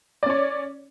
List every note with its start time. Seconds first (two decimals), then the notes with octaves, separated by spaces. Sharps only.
0.23 D5
0.26 C#4
0.30 C#5